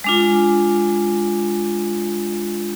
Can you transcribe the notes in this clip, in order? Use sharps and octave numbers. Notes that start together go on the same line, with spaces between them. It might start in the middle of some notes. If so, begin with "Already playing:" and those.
G#3 D4 F4